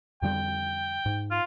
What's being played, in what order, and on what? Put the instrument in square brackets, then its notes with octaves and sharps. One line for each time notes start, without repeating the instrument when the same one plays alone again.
[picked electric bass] F2 D3 G3 [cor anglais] G5
[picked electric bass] G#2
[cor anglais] F4